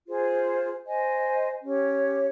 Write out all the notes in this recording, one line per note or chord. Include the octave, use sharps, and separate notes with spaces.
F4 G#4 C5
C5 D#5 G#5
C#4 G4 C#5